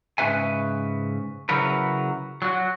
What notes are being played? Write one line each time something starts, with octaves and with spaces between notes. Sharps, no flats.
G#2 C#3 C#4 B4 E5 G#5
C#3 F#3 E4 F#4 A#4 B4
F#3 F#4